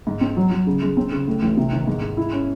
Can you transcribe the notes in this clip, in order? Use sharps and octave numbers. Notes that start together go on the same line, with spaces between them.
G#2
C4
F#3
F#3
C#3
G#3
C4
C#3
A2
A1
C3
D#3
G#2
G#2
E4
C#4